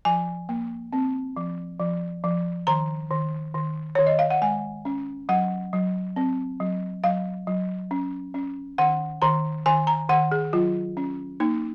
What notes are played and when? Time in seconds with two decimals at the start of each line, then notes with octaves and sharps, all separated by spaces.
0.05 F3 G#5
0.49 A#3
0.93 C4
1.37 F3
1.80 F3
2.24 F3
2.67 D#3 A#5
3.11 D#3
3.54 D#3
3.95 D#3 C#5
4.07 D#5
4.19 F5
4.30 F#5
4.42 G#3 G#5
4.85 C#4
5.29 F#3 F#5
5.73 F#3
6.16 C4
6.60 F#3
7.04 F#3 F5
7.47 F#3
7.91 C#4
8.34 C#4
8.78 D#3 F#5
9.22 D#3 A#5
9.66 D#3 G#5
9.87 A#5
10.09 D#3 F#5
10.32 G#4
10.53 F#3 F4
10.97 C#4
11.40 A#3 D#4